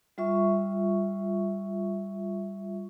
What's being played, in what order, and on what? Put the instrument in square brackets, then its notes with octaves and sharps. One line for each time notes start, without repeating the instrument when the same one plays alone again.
[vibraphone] G3 F4 E5 C#6